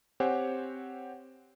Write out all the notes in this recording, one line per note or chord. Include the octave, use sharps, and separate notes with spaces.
C4 G4 C5 C#5 F#5 G#5